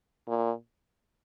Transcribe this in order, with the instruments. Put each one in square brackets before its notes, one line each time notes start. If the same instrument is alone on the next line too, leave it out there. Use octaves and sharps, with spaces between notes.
[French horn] A#2